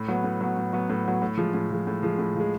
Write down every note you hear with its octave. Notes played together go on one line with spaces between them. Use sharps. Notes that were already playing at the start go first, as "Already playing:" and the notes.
Already playing: A2
F#3 B3
A2
F#3 B3
A2
F#3 B3
A2
F#3 B3
A2
F3 G#3
A2
F3 G#3
A2
F3 G#3
A2
F3 G#3